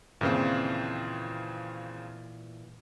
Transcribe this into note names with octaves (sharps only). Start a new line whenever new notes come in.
D#2 A#2 C#3 E3 C4